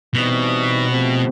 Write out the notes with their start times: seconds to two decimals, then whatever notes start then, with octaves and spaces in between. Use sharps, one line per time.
0.14 B2 E3 G3 C4 D#4
0.90 C3 F3 A3 C4